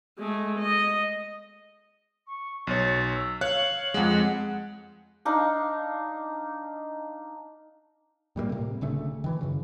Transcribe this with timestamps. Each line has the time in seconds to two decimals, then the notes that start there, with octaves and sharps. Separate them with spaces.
0.18 G#3 A3
0.59 D#5
2.27 C#6
2.67 B1 C#5 A6
3.14 E6
3.41 C#5 F5 F#6 F#7
3.94 F2 G#3 F#5
5.25 D4 D#4 F5
8.36 A2 G3 G#3 A#3
8.49 A2 C3
8.81 D1 D2 C#3 A3
9.24 D#3 E3
9.41 F#2 C#3